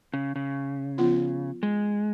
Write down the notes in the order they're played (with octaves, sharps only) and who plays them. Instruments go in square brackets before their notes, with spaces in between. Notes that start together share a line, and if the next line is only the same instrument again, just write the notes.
[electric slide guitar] C#3
C#3
[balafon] F3 B3 F4
[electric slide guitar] G#3